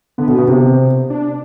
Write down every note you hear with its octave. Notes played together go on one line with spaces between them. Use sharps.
D3 B3
B2
B2
C3
D4